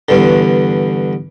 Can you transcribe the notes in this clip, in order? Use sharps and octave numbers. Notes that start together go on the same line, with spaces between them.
E2 G2 D3